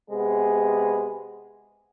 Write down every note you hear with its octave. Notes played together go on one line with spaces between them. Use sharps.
C3 G#3 B3 G#4